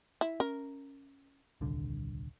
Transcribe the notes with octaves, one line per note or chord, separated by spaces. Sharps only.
E4
C#4 A#4
D#1 C2 D3